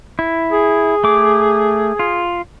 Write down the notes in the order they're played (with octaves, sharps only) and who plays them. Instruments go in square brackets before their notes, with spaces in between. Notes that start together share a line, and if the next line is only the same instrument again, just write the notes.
[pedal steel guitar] E4
[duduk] G#4
[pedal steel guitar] A3 D6
F4